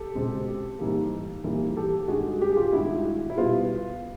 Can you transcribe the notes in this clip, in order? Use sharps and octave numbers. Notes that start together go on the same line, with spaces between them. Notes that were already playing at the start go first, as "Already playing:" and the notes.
Already playing: G4 A4
C#2 B2 G#3 C4
G#2 E3 G3 A#3
G#2 E3 G3 A#3
G4 A4
G2 D#3 G#3 F#4 G#4
G4
G#4
F4 G4
G2 D#3 G#3 E4 F#4
E4
B2 G3 B3 F4